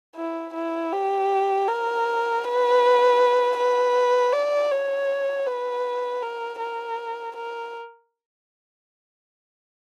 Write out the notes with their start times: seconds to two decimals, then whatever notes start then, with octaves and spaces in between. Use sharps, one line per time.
0.16 E4
0.54 E4
0.93 G4
1.68 A#4
2.44 B4
3.57 B4
4.33 D5
4.71 C#5
5.47 B4
6.22 A#4
6.59 A#4
7.36 A#4